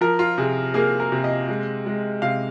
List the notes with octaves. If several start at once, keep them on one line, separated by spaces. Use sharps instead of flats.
F3 A#4
F4
C3 G#4
A#3 G#4
A#4
C3
D#5
G#3
G#3
C3 F5